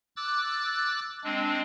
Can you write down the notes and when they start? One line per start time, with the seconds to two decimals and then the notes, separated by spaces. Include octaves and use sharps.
0.16 D6 E6 F#6 A6
1.24 G#3 C4 D4